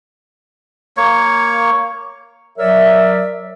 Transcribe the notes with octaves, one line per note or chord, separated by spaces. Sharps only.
A#3 C#5
F#3 A#4 C#5 D5 E5